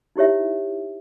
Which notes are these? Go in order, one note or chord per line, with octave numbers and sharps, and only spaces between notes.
D#4 E4 G4 C#5 E5